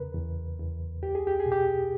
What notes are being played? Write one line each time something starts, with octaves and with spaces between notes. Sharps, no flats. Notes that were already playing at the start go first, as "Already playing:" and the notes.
Already playing: E2 C#3 A#4 B4
E2
E2
C#2 G4
G#4
G4
G#4
B2
G4